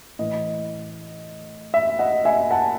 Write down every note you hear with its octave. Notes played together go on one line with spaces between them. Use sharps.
A2 E3 D#5
E5
D#5 F#5
E5 G#5
F#5 A5